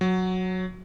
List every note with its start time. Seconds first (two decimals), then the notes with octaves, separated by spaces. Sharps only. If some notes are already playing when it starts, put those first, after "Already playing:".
0.01 F#3